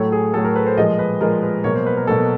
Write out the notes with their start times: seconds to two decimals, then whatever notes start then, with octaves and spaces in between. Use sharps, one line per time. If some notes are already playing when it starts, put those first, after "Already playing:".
Already playing: A2 F#3 A3 C#5
0.12 G#4
0.34 A2 F#3 A3 A4
0.45 A#4
0.56 B4
0.66 C5
0.77 A#2 F3 G#3 D#5
0.99 B4
1.21 A#2 F3 G#3 A#4
1.43 B4
1.64 B2 F#3 A#3 C#5
1.75 C5
1.86 B4
1.97 A#4
2.07 B2 F#3 A#3 A4